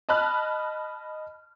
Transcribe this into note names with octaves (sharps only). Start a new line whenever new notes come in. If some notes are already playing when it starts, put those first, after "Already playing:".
D#5 A5 B5 F6 F#6